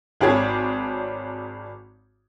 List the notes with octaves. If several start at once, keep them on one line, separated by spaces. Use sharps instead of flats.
G#1 D4 G4 G#4 C#5 G#6